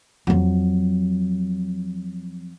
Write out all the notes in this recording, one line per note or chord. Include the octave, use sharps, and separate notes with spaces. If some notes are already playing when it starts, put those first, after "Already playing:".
F2 F#3